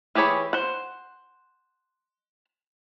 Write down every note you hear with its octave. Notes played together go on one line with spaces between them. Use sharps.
E3 G4 G#4 C#5 B5
C5 F#5